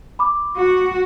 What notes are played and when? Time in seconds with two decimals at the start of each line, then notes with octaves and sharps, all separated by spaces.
0.19 B5 D6
0.57 F#4